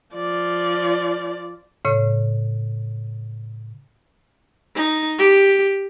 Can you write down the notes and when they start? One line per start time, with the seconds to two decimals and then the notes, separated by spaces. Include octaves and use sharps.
0.15 F3 D5
1.85 A2 C#3 C#5
4.76 D#4
5.18 G4